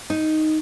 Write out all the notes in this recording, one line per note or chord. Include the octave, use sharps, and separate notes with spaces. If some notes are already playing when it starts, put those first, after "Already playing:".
D#4